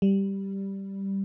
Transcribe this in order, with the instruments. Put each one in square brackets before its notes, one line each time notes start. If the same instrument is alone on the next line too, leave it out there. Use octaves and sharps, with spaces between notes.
[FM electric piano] G3